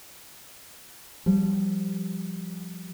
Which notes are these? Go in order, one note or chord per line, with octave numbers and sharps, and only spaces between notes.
F3 G3